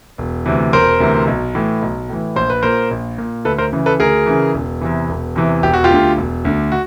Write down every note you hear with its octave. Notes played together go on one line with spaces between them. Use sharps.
E1
D2 C3 E3
E1 A#4 C5
D2 C3 E3
B1
A2 E3
B1
A2 E3
A#1 C5
B4
A#2 A#4 C5
A#1
A#2
D2 A4 B4
A#4 C5
C#3 E3
A4 B4
D2 G#4 A#4
C#3 E3
E1
E2 C3 E3
E1
E2 C3 E3
E1 G4
F#4
F4 G4
D2 D3
E1
D2 D3
F#4